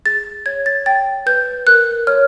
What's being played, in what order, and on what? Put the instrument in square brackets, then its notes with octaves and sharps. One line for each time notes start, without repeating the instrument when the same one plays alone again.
[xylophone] G#4 A6
C#5 G#6
A6
G5 A6
B4 G6
A#4 F#6
C#5 F6